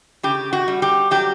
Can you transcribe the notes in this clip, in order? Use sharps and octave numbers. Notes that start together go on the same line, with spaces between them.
C#3 G4
F#4
G3
G4
F#3 G4